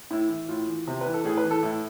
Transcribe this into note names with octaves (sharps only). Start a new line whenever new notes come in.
A2 E4
E3
A2 F4
E3
C3
B4
E3
A4
A2 G#4
B4
E3
A4
A2 E4